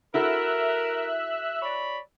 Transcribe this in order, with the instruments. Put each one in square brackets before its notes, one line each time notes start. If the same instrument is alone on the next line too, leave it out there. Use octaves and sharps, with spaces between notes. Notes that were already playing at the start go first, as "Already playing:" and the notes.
[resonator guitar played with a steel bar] E4 F#4 A4 [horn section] A#4 [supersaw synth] E5 E6 F#6
[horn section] C#5 D5 B5